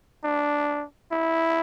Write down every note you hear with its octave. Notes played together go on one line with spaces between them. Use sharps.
D4
E4